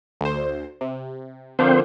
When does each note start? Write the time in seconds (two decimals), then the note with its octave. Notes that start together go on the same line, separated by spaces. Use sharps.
0.21 D2 C5
0.81 C3
1.59 D3 F3 A#3 C4 C5